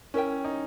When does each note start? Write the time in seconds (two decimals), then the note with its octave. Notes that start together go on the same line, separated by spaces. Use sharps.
0.14 C#4 E4 A#4 E5 G5
0.44 D#4